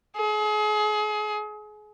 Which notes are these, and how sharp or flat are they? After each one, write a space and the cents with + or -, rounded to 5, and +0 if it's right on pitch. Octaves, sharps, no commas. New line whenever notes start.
G#4 +35